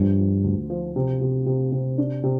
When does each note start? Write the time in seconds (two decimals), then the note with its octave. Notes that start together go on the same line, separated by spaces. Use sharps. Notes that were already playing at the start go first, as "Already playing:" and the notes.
Already playing: G2 F3
0.19 F3
0.44 D2
0.70 F3
0.96 C3
1.21 C3
1.46 C3
1.72 C3
1.98 D4
2.23 C3